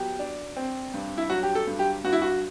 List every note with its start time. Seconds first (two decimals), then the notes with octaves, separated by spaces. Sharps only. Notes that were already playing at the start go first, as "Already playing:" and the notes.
Already playing: F#3 B3 G4
0.19 D4
0.57 C4
0.94 G2
1.18 E4
1.30 F#3 F#4
1.43 G4
1.55 A4
1.67 G2
1.79 G4
2.04 G2 F#4
2.13 E4
2.22 F#4